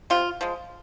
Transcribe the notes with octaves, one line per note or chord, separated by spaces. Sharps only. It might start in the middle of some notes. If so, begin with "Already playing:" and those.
C3 F4
F3 G#3